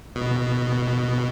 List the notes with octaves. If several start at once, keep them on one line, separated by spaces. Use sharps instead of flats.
B2